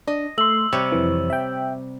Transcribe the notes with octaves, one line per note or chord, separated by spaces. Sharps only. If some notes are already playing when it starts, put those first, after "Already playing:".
D4 D#5
A3 C6 E6 F#7
C3 G3 C#5 G5
F2 E3
E5 G5